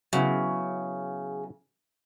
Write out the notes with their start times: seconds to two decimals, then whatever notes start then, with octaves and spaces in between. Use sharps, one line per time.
0.13 C#3 F#3 B3 E4